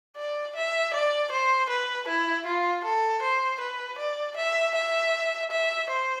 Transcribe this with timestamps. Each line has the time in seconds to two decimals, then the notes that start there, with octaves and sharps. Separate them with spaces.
0.16 D5
0.55 E5
0.93 D5
1.31 C5
1.69 B4
2.08 E4
2.46 F4
2.84 A4
3.22 C5
3.60 B4
3.98 D5
4.36 E5
4.75 E5
5.51 E5
5.89 C5